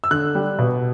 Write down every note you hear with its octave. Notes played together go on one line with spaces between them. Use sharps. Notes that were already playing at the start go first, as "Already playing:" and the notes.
E6
D3 F#6
G3
B2